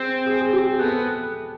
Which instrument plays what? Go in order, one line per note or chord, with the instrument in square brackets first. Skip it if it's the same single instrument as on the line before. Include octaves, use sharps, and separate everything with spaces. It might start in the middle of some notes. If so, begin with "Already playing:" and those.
Already playing: [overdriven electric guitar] C4 [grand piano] G#4
[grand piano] G#4
G#4
G4
G#4
[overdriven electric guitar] B3 [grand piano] A4